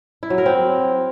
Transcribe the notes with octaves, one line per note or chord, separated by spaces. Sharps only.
E4
F#3
A#4
C4